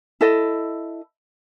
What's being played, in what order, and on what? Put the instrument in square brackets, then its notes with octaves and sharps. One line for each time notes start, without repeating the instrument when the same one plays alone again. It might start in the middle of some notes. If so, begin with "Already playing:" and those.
[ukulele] E4 A4 D#5